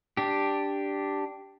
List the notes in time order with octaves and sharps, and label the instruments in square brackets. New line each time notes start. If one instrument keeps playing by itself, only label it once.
[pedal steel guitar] D4 G4